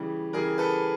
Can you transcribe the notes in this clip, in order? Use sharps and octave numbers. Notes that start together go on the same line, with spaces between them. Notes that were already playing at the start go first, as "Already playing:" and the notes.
Already playing: C#3 E3 G3
C#3 E3 G3 G#4 A#4
A4 B4